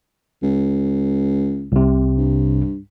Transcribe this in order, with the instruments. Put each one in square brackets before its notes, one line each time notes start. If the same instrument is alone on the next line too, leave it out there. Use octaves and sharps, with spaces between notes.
[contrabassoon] C#2
[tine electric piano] C2 C3
[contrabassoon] G2